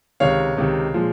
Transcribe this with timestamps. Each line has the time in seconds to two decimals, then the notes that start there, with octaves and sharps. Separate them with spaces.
0.20 C#2 C3 D#3 C#5 F5
0.57 C#2 C3 D#3
0.94 A#2 F3 G#3